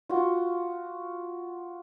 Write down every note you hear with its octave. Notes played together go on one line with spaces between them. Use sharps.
F4 F#4